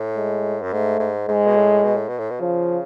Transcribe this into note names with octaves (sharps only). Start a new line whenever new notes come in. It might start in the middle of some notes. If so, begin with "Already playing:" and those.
Already playing: A2
G#3
F#2
G#2 A3
G#2
G#2 G#3
B2
A2
B2
A2
B2
A2
B2
C#3 F3